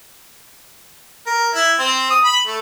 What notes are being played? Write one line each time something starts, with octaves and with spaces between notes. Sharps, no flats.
A#4
E4
C4
D#6
B5
A3